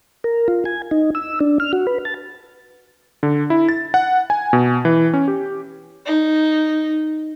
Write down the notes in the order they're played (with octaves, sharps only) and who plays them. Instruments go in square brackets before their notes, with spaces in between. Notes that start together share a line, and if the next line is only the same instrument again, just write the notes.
[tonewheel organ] A#4
F4
G#5
D#4
E6
D4
F6
F#4
B4
A5
[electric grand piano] D3
E4
A6
F#5
G#5
B2
E3
C#4
G4
[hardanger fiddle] D#4